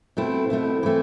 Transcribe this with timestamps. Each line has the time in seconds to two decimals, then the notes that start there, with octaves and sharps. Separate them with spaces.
0.17 B2 A3 C4 E4
0.50 B2 A3 C4 E4
0.83 E3 A3 C4